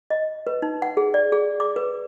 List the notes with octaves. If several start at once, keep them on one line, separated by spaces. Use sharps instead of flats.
D#5
B4
D#4
F#5
G#4
D5
G#4
D6
B4